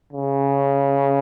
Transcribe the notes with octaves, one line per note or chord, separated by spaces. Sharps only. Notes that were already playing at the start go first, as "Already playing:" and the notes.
C#3